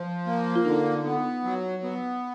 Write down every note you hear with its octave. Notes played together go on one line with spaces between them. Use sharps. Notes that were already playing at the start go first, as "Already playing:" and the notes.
Already playing: F3
A#3
F4
D3 D#4
B3
F#3
B3